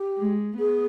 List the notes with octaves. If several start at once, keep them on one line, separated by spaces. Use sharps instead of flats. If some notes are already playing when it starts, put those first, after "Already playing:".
Already playing: G4
G#3
B3 G#4